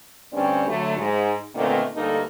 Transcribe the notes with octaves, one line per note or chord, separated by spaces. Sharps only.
D2 G2 C4 C#4 D5
D3 F#3 A3
G#2
A#2 D3 D#3 A3 B3 C4
D2 G2 A#3 D#4 A4